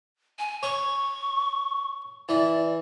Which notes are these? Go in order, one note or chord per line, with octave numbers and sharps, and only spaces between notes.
G#5
C#5 C#6
E3 D5